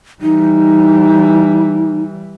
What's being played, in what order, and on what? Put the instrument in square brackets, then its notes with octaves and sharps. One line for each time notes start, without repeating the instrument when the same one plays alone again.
[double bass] E3 G3 [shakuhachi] D#4